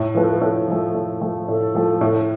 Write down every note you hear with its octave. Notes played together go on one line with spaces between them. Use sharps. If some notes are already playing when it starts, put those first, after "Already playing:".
Already playing: A2
F3 A3 B4
A4
B4
A2 A4
F3 A3
A2
F3 A3
A2 A4
F3 A3
A2